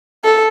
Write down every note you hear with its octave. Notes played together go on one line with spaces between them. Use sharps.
A4